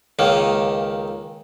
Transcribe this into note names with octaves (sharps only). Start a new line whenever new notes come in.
C#2 D#3 A#3